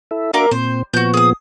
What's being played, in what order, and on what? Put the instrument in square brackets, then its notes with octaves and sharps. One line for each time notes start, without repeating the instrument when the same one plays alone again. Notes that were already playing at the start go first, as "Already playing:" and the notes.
[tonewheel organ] E4 A4 E5
[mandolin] A#3 A#4 D6 [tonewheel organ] D4 F#4 E5
[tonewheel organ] A#2 C4 [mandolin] C5
[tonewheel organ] A#2 F3 B3 [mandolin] F#4 G6
[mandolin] G#4 D#6